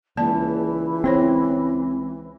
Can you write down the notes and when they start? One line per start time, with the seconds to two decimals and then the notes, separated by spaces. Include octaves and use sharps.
0.17 C#2 E3 A#3 D5 A5
1.04 C4 E4 C5 C#5